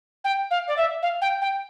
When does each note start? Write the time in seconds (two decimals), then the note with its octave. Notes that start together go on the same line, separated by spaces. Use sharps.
0.24 G5
0.51 F5
0.68 D5
0.77 E5
1.02 F5
1.22 G5
1.41 G5